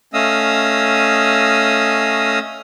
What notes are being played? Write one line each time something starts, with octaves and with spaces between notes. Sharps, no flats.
A3 C#4 D#5 F5 D#6 E6